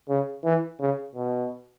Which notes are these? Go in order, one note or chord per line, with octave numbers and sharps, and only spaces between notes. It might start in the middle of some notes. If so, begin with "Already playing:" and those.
C#3
E3
C#3
B2